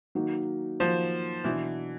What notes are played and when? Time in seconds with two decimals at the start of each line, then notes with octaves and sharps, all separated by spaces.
0.15 D#3 F#3 A#3 D#4 F#4
0.79 D#3 F3 F#3 A#3 D#4 F#4
1.44 B2 E3 F#3 B3 D4